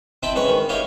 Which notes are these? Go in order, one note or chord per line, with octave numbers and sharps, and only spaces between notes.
C4 E4 D#5 G5 A5 B5
G#2 C#4 B4 B5 C#6
D#3
E4 G4 C#5 D#5 F5